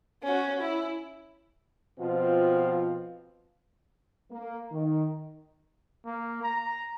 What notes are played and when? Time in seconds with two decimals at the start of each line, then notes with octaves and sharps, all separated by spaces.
0.23 C#4 F#4
0.61 E4
1.99 B2 F3 C4 F4
4.31 A#3
4.72 D#3
6.06 A#3
6.43 A#5